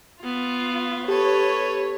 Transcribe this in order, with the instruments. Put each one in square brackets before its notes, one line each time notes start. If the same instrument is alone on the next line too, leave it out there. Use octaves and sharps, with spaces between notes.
[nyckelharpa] B3 [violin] F4
[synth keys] G4 [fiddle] A4 B4 [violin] C#5